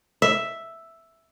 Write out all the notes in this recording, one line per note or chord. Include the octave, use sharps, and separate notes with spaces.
E5